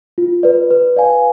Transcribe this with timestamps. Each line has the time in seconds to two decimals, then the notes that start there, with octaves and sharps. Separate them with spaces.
0.18 F4
0.43 B4 D5
0.71 B4
0.96 D5 F5 G#5